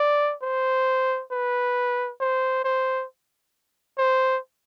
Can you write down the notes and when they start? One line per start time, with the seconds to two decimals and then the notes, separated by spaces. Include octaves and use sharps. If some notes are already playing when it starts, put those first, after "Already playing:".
Already playing: D5
0.42 C5
1.32 B4
2.21 C5
2.64 C5
3.98 C5